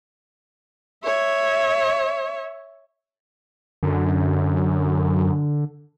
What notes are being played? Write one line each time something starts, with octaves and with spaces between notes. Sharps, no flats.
C#5 E5
F#2 D3